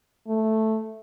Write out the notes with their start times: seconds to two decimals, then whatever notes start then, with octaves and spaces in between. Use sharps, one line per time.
0.28 A3